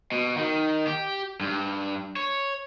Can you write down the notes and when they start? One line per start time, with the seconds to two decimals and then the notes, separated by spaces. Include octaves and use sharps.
0.12 B2
0.37 D#3
0.87 G4
1.41 G2
2.16 C#5